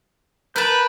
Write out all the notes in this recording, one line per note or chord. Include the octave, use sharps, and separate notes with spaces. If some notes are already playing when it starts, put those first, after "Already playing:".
A#4 B4 A5 B5 G6